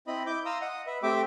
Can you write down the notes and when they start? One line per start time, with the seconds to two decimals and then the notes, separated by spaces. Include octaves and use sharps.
0.07 C4 E4 D#5 B5
0.26 E4 D6 G6
0.46 F5 A#5 C6 D#6 E6
0.61 D#5 F#5 D#6
0.87 B4 E5
1.03 A3 C4 G4 E5 G5 D6